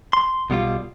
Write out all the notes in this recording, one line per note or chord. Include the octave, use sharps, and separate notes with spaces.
C6
B1 B2 G3 F4